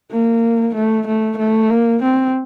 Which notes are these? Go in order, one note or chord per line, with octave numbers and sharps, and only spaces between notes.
A#3
A3
A3
A3
A#3
C4